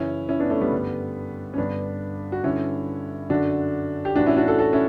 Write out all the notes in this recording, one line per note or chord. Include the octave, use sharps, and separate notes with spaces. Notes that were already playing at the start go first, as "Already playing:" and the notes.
Already playing: F#2 C#3 E3 C#4 E4
C#4 E4
B3 D4
A3 C#4
G3 B3
G2 D3
C#4
G2 D3 B3 D4
F#4
G2 D3 C#4 E4
F#2 D3 D4 F#4
G4
A2 E3 D4 F#4
C#4 E4
D4 F#4
F#4 A4
F#4 A4
C#4 E4